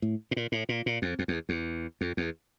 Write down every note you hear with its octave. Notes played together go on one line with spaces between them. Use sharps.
A2
A2
A#2
A2
A#2
A#2
F2
F2
E2
E2
F2
E2